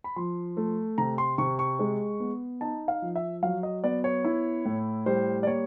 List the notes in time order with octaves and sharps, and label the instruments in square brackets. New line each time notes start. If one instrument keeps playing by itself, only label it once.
[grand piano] B5
F3 C6
A3
C3 A#5
C6
C3 C#6
C#6
G#3
B3
D#4 A5
F5
F3
E5
F#3 F5
D#5
B3 D5
C#5
E4
A2
G3 C5
D5
A#3 C#5